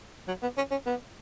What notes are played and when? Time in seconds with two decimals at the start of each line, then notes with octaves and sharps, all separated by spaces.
0.28 F#3
0.42 B3
0.57 C#4
0.71 C#4
0.86 B3